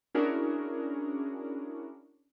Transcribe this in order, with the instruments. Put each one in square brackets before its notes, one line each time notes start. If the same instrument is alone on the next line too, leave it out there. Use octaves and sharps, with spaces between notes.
[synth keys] C#4 D4 E4 F#4 G#4 A#4